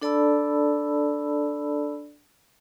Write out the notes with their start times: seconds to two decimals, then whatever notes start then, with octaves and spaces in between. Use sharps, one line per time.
0.02 D4 A4 D5 A5 B5 E6